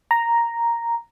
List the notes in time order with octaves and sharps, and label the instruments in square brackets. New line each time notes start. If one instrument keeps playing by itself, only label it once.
[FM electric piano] A#5